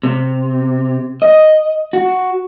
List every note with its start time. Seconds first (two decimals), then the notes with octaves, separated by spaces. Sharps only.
0.03 C3
1.22 D#5
1.93 F#4